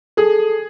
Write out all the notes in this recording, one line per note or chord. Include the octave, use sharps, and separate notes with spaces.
G#4 A4